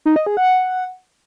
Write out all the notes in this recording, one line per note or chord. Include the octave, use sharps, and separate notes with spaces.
D#4
D#5
G#4
F#5